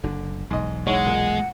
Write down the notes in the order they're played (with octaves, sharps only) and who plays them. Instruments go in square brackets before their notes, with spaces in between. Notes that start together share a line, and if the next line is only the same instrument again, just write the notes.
[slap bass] F#1 [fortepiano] D3
[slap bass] E1 B1 [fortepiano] G#2 D#5
[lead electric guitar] G#3 [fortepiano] D#4 E4 C#5 [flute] F#5
[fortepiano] A#2